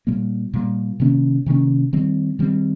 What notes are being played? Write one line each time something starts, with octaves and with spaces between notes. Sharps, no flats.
A#2 G3 A#3
A#2 G3 A#3
C3 D#3 A#3 C#4
C3 D#3 A#3 C#4
D#3 G3 C4
D#3 G3 C4